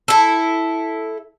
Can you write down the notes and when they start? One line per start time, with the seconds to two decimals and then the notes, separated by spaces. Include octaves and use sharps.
0.08 E4 A4